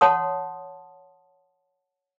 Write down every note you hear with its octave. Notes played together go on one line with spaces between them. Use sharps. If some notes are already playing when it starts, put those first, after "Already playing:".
C#5 F#5 A5 C6 D#6